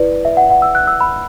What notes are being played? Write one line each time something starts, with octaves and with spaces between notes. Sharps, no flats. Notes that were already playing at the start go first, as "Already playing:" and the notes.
Already playing: E4 B4 D5
E5
F#5
F#5
E6
F#6
E6
B5